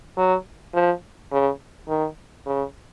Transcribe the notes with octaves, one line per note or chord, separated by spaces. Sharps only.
F#3
F3
C#3
D#3
C#3